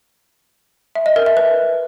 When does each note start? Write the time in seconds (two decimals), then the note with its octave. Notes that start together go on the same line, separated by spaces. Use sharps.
0.95 E5
1.06 D#5
1.16 A#4
1.26 E5
1.37 B4